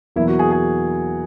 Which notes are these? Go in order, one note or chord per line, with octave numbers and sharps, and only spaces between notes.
E2 B2 F#3 A#3 E4
F#4
G#4
G#4